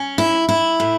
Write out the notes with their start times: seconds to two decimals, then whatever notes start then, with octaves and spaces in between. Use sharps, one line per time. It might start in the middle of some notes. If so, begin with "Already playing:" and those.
Already playing: C#4
0.18 E4
0.49 E4
0.80 A2